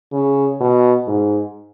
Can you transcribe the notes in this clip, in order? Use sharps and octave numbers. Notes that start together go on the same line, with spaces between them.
C#3
B2
G#2